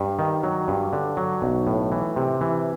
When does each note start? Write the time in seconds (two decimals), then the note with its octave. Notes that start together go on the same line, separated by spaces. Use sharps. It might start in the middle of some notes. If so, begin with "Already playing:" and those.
Already playing: G2
0.19 D#3
0.44 F#3
0.68 G2
0.93 D3
1.17 F#3
1.42 B1
1.67 A2
1.92 E3
2.16 C3
2.41 E3